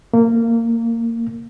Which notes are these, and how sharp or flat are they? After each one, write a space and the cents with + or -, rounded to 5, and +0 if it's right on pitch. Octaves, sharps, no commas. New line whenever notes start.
A#3 -20